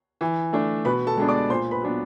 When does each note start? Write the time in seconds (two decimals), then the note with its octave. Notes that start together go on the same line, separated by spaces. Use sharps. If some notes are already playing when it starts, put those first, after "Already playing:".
0.21 E3
0.53 A3 D4
0.85 B2 B4 B5
1.07 A4 A5
1.18 G#3 B3 D4
1.28 D5 D6
1.50 A#2 C5 C6
1.71 B4 B5
1.82 F#3 B3 D4